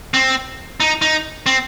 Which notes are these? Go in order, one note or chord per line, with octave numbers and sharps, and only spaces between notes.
C4
D#4
D#4
C4